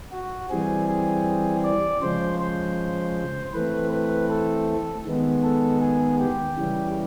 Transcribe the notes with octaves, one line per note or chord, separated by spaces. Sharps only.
F#4
E3 G3 C4 G#4
G#4
D5
C#3 F3 G#3 C5
C5
E3 A3 C4 B4
B4
A4
D#3 G#3 B3
A4
G#4
G4
C#3 E3 G3